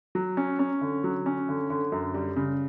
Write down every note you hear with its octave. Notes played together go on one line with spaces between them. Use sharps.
F#3
C#4
C#4
D3
F#3
C#4
D3
D3
F#2
G3
C#3